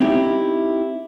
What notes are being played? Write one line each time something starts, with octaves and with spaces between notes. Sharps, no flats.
C4 D#4 E4 G4